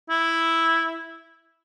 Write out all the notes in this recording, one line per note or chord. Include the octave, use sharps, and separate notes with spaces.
E4